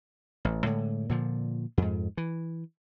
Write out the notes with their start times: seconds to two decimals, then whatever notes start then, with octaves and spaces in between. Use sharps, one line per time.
0.45 A1
0.63 A2 D3 G#3
1.09 A#2 D3 F3
1.78 F2 G#2
2.17 E3